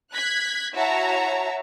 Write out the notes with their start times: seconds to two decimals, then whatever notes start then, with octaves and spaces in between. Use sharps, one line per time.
0.12 F#6 G#6 B6
0.75 E4 F#4 C#5 E5 A5 A#5